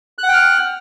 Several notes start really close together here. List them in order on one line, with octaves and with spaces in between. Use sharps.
F#6 F#5 G5 F6